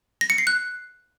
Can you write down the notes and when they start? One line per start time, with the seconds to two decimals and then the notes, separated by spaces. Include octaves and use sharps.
0.21 A#6
0.30 C#7
0.38 C7
0.47 F#6